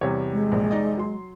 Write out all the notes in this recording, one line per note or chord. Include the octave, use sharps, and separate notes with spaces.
E2 C3 G3 C#5
G#3
A#1
D#4 D5 D#5
F#3 C6